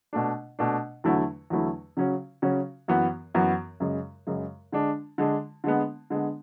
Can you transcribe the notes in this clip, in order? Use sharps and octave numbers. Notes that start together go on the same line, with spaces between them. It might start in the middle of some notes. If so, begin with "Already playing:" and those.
B2 A3 D4
B2 A3 D4
E2 D3 F#3 A3 E4
E2 D3 F#3 A3 E4
C#3 F#3 C#4 F#4
C#3 F#3 C#4 F#4
F#2 E3 B3 F#4
F#2 E3 B3 F#4
F#2 C#3 G#3
F#2 C#3 G#3
D3 G#3 D4
D3 G#3 D4
D3 G#3 B3
D3 G#3 B3